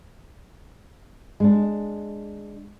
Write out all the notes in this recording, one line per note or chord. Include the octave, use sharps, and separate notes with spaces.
G#3 D4